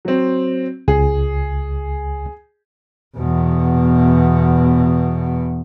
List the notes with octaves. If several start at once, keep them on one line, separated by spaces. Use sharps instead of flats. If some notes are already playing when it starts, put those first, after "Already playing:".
F#3 C4
C#2 G#4
E2 B2